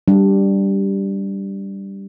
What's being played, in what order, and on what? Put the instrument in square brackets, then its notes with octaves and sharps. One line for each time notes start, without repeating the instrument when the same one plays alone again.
[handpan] G3 D4